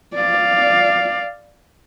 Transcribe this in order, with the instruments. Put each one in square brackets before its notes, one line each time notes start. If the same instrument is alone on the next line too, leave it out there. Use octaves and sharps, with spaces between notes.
[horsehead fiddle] D5 F5